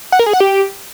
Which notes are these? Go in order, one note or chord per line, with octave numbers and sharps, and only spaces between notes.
F#5
A#4
G#4
F#5
G4